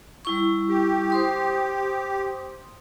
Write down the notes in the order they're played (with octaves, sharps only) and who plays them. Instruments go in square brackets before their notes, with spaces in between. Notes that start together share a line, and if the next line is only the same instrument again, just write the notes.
[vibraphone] G3 E4 C#6
[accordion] G4
[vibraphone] C5 C6 D#6